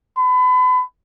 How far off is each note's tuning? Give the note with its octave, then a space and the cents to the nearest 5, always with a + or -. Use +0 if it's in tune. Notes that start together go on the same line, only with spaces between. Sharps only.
B5 +35